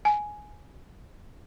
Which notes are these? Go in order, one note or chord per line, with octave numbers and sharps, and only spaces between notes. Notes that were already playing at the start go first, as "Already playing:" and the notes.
G#5